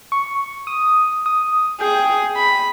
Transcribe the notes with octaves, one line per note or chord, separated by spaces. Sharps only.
C#6
D#6
D#6
G#4 G5
B5